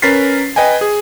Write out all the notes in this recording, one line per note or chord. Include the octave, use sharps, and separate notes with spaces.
C#4 A#4 B4 A6 B6 C7
B4 D#5 G5 G#5
G#4